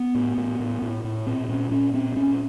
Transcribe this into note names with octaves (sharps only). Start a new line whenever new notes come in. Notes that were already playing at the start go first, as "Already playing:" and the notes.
Already playing: B3
A2
A2
A2
A2
A2
A#2 C4
A#2 C#4
A#2 C#4
A#2 C4
A#2 C#4